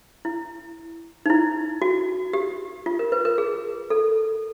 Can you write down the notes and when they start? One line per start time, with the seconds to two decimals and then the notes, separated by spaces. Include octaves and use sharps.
0.25 E4
1.26 D#4
1.30 E4
1.82 F#4
2.33 G4
2.86 F4
2.99 A#4
3.12 B4
3.25 A#4
3.38 G#4
3.90 A4